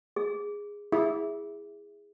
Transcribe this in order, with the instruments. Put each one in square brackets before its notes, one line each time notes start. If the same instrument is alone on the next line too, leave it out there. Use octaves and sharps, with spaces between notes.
[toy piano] G#4
[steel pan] E4 [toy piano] G#4